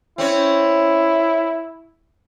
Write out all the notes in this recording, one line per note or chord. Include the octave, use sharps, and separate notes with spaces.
C4 C#4 E4 C#5